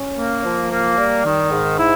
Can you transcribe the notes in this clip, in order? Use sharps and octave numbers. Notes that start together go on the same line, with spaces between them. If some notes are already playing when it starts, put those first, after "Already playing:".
Already playing: C#4
A#3
F3
A#3
G3
D#3
G#2
E4